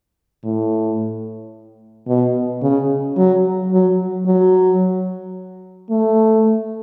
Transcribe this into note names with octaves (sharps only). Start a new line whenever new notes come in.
A2
B2
C#3
F#3
F#3
F#3
A3